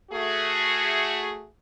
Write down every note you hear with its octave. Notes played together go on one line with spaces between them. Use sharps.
A3 F#4 G#4